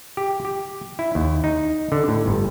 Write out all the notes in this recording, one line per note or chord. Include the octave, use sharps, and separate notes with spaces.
G4
G4
E4
D#2
D#4
D3
A2
G1